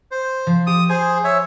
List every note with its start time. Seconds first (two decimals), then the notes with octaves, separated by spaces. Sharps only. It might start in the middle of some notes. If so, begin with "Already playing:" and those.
0.11 C5
0.47 F3
0.67 G4 D#6
0.89 G#4 C5 G#5
1.24 C#5 E5